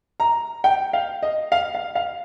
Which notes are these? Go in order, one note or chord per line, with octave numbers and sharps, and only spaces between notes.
A#5
G5
F5
D#5
F5
F5
F5